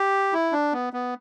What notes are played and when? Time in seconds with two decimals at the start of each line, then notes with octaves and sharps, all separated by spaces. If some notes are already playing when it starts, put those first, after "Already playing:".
Already playing: G4
0.33 E4
0.52 D4
0.73 B3
0.93 B3